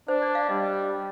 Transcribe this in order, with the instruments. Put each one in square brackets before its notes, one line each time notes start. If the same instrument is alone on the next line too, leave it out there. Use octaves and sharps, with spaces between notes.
[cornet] D4 [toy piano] C5
[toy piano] D5
F5
[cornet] G3 [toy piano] D#5